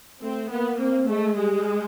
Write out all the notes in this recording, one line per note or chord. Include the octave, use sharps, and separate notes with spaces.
A3 C4
A#3 B3
A#3 C4
G#3 A3
G3 G#3